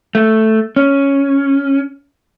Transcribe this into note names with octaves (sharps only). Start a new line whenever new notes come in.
A3
C#4